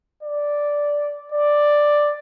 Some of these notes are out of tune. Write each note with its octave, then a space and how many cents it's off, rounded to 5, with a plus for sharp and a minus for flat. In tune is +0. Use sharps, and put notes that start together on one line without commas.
D5 -5
D5 +5